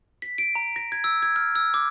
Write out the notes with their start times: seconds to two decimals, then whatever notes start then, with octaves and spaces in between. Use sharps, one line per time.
0.22 B6
0.38 D7
0.55 A#5
0.76 A#6
0.92 G#6
1.04 E6
1.22 G#6
1.36 F6
1.55 E6
1.74 D6